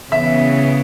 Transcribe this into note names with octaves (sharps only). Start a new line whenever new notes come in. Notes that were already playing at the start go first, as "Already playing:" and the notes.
C#3 E3 B3 E5